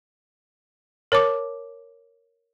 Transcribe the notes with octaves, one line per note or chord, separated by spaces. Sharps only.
A#4 C#5 A5 D6